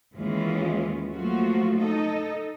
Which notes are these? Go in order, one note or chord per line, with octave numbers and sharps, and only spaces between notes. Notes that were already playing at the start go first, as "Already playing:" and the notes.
D#2 E3 G#3 C#4 F4
F3 F#3 A3 A#3 F4 F#4
D#4 A4 D#5